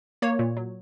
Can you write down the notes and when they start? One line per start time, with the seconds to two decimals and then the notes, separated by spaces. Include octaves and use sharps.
0.22 A#3 C#5
0.39 A#2
0.57 F#3